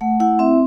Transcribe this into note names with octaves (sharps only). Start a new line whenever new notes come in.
A3 F#5
E4 F#5
C4 E5